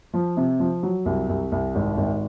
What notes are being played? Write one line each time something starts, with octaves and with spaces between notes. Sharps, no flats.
F3
C3
F3
F#3
C2
C2
C2
G#1
G#1